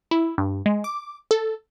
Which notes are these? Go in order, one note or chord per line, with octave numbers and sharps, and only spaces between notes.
E4
G2
G#3
D6
A4